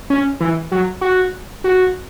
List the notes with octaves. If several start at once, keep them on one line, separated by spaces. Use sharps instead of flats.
C#4
E3
F#3
F#4
F#4